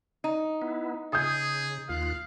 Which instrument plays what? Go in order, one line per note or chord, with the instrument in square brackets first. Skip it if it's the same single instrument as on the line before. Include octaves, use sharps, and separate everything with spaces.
[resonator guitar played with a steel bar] D#4
[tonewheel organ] B3 E4
[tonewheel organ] C#3 [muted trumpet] G#4 [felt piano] D#6 G6
[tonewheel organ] D#2 F4 F#6 [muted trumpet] F5